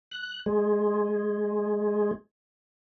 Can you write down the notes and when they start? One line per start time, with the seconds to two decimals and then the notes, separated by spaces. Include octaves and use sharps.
0.11 F#6
0.46 G#3